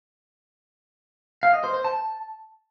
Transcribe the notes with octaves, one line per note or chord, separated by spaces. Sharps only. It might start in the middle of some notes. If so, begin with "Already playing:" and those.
F5
D#5
C5
C5
A5